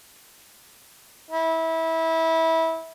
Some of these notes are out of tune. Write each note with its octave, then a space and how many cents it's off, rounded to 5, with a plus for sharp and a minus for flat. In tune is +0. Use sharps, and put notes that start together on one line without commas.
E4 -20